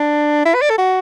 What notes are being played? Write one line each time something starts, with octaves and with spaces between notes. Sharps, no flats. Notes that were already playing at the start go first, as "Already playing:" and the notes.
Already playing: D4
E4
B4
D5
A4
F#4